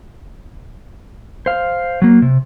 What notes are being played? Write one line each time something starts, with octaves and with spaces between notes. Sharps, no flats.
C5 F5
F#3 A#3
C3